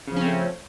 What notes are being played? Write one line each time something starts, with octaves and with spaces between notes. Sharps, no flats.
C#3 F3 A3 C4 C#4